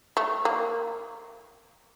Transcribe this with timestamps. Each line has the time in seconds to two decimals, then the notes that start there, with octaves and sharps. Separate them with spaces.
0.17 A3
0.45 A#3